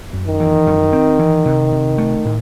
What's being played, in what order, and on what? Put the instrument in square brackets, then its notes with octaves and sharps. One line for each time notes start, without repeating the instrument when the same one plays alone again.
[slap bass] F#2
[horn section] D#3
[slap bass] E3
F#2
C4
E3
C3
C3
A3
A2